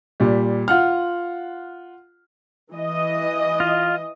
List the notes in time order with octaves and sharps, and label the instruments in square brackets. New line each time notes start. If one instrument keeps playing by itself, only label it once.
[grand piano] A#2 G3
F4 F#5 F6
[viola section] E3 D#5
[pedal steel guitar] F4